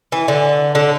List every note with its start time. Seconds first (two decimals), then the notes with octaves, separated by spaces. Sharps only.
0.12 E3
0.28 D3
0.75 D3